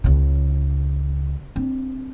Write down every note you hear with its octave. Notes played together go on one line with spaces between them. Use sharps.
C#2 C#3
C4 D4